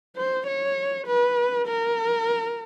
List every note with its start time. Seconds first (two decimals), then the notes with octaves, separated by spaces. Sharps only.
0.16 C5
0.47 C#5
1.07 B4
1.68 A#4